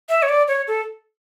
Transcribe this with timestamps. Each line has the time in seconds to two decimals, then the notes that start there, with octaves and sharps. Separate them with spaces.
0.09 E5
0.22 C#5
0.29 D5
0.48 C#5
0.68 A4